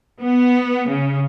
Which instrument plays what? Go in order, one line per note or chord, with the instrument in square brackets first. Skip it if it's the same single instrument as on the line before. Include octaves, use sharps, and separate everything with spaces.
[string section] B3
C#3